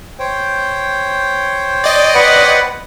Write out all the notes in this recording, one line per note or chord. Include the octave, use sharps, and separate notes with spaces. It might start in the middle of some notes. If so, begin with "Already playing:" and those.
C5 C#5 G5
D5 D#5
B4 F#5